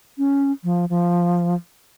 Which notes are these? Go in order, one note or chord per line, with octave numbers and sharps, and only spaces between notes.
C#4
F3
F3